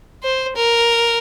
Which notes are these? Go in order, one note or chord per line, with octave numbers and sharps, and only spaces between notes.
C5
A#4